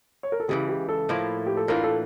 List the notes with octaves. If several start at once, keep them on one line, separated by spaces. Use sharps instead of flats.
C#5
A#4
A4
C#2 C#3 E3 G4
G4
A4
A2 F3 A#3 E4
G4
A4
A2 E3 A#3 D4 F4 A#4
A4